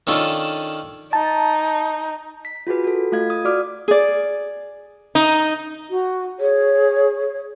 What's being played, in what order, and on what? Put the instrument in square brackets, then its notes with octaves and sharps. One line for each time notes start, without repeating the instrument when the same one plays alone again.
[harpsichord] D#3 C#4 D4 F4 A4
[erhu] D#4 [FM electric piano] A5
[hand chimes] B6
F4 F#4 G#4 B4
F#4 A4
A3 F4 F5 G#6
D#6
F#4 D5 D6 F6
[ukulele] G#4 D5
[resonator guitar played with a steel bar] D#4
[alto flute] F#4
[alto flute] G#4 [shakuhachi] C#5